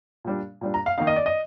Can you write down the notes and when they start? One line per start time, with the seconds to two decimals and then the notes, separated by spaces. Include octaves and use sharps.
0.25 A#2 G3 D4
0.61 A#2 G3 D4
0.74 A#5
0.86 F5
0.98 D#3 A#3 D#4 F5
1.07 D#5
1.16 D5
1.26 D#5